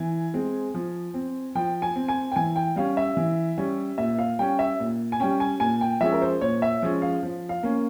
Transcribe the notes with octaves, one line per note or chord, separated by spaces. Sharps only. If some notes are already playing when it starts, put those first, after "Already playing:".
Already playing: E3 G#5
G#3 C4
F3
C4
F3 G5
G#5
C4
G#5
G5
E3 G#5
G5
G3 C#4 F5
E5
E3
G3 C#4
A#2 E5
F5
G3 C#4 G5
E5
A#2
G#5
G3 C#4 G5
G#5
A#2 G#5
G5
F3 G#3 C#4 E5
A#4
C5
A#2 C#5
E5
F3 G#3 C#4
F5
F3
F5
A#3 C#4